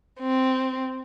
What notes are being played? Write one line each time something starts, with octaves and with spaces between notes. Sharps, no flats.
C4